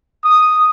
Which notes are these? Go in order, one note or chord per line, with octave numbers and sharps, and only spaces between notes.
D#6